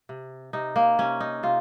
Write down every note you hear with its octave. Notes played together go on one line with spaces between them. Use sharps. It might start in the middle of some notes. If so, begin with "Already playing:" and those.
C3
C3 D#4
A#3
C3 C#4
D#4
C3 F4